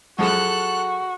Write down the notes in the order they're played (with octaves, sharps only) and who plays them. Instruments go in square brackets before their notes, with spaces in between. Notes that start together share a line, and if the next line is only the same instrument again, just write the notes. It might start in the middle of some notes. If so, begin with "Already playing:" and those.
[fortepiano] F#2 F3 G#3 [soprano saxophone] F#4 [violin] A4 F#6